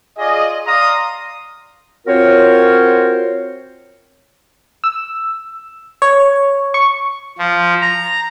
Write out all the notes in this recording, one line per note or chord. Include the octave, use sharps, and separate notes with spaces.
F4 G#4 D5 D#5
D5 F5 A#5 C6 D#6
C4 F4 F#4 A#4 C5 C#5
E6
C#5
C#6
F3
A#5